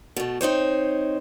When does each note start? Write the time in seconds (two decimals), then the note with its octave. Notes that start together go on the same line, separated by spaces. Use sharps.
0.16 B2 A3
0.41 C4 D#4 C5 C#5